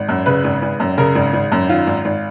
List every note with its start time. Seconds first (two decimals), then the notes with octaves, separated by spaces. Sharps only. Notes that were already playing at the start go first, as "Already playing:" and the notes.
Already playing: G#1
0.09 F#2
0.26 C#3 B4
0.44 G#1
0.62 G#1
0.80 F#2
0.98 C#3 A#4
1.15 G#1
1.33 G#1
1.52 F#2
1.69 D#3 F4
1.87 G#1
2.05 G#1